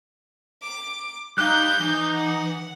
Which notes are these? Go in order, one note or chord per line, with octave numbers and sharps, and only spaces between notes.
D6
G3 D#4 F5 D6 F#6 G6
E3 D#4
F#5